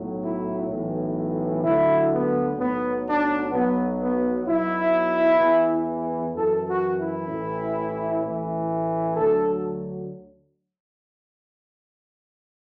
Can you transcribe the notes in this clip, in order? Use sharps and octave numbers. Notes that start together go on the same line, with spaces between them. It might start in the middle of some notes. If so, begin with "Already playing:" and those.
Already playing: B1 A2 F#3
E4
B1 A2 E3
D2 D3 F#3 E4
B3
B1 A2 F#3 B3
D4
B1 B2 F#3 B3
B3
B1 B2 F#3 E4
E2 E3
F#2 E3 A4
F#4
E4
A1 A2 E3
A1 A2 E3
D2 D3 F#3 A4